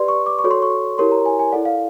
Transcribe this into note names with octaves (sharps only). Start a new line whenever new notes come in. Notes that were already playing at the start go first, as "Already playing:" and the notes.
Already playing: G4 B4 D5 C6
C#6
D6
C#6
F#4 A4 C#5
C6
C#6
E4 G4 A#4 C#5 C6
A#5
G#5
G#5
E4 A4 D5 F#5
F5